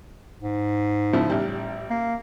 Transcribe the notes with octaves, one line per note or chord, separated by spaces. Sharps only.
G#2
C#3 F3 E4
A1 G3
A#3